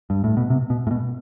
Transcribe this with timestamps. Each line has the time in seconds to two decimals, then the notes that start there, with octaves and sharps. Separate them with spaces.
0.10 G2
0.24 A2
0.37 B2
0.50 C3
0.70 B2
0.87 A2
0.91 B2